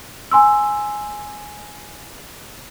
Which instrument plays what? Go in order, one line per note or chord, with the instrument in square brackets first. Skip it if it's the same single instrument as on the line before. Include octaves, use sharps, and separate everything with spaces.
[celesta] G#5 C6 E6